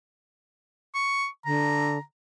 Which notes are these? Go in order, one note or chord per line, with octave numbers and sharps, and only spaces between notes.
C#6
D3 A#5